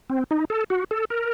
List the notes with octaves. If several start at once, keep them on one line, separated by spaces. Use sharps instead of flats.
C4
D#4
A4
F#4
A4
A#4